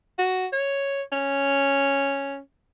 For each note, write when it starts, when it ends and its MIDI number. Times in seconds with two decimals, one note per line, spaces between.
0.18 0.47 66
0.52 1.02 73
1.12 2.39 61